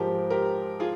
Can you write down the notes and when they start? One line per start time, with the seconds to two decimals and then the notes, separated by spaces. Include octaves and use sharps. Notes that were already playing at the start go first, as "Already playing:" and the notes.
Already playing: G#2 F3 G#3 G4 A#4
0.30 G4 A#4
0.80 F4 G#4